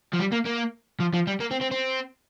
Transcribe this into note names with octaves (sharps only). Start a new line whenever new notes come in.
F3
G3
A#3
A#3
F3
F3
G3
A#3
C4
C4
C4